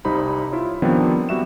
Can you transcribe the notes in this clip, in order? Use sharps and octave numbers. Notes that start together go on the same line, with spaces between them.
C2 G3 D#4 G4 C5 B5
E4 F4 C#5
D#3 F3 G3 B3 C4 D4
G3 B3 F#4 E5 E7